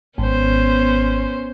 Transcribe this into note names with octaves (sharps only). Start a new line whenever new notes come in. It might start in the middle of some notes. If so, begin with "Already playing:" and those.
G#1 B3 C#4 C5